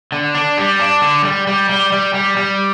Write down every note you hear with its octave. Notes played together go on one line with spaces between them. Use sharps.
D3
D4
G3
D4
D3
G3
G3
G3
G3
G3
G3